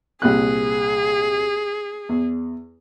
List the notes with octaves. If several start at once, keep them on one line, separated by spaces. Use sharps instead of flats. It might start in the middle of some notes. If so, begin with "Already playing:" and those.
C2 A#2 G#4 F#6
E2